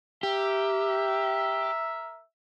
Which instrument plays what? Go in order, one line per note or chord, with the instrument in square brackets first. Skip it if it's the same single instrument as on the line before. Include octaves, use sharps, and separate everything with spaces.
[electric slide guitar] G4 [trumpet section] A#4 E5